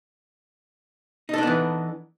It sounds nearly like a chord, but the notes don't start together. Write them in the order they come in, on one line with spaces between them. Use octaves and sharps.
D#4 A4 D4 B3 E3